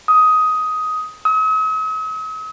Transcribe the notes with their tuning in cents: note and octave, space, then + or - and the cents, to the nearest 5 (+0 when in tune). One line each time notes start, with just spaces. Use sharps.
D#6 +10
D#6 +45